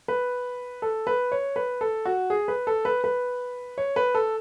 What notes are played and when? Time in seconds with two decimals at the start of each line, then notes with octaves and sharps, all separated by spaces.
0.08 B4
0.82 A4
1.07 B4
1.32 C#5
1.56 B4
1.81 A4
2.05 F#4
2.30 G#4
2.48 B4
2.67 A4
2.85 B4
3.04 B4
3.78 C#5
3.96 B4
4.15 A4